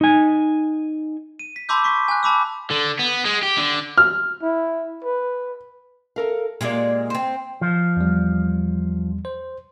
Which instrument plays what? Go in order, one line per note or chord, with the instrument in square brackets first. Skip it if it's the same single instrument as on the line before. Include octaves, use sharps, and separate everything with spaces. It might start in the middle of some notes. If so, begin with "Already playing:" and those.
[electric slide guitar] D#4 G#5
[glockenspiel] D#7
B6
A5 B5 C6 D6 E6 G6
C#6 B6
G#5 F#6
A5 B5 D6 E6
[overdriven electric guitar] D3
B3
G#3
G4
D3
[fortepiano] F6
[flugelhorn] E4
B4
[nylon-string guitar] A4 A#4 F5
[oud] A#2 G#3 A#3 [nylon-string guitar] G4 D5
[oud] C4 C5
[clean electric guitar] F3
[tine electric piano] E2 G3
C5